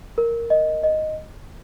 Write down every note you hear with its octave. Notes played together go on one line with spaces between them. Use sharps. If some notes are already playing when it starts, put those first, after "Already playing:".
A#4
D#5
D#5